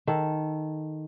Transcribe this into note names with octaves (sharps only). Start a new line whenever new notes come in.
D#3 A4